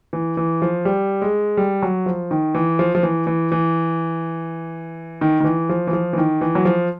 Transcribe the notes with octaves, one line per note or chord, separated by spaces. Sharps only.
E3
E3
F3
G3
G#3
G3
F#3
F3
D#3
E3
F3
F3
E3
E3
E3
D#3
D#3
E3
F3
E3
F3
E3
D#3
E3
F#3
F3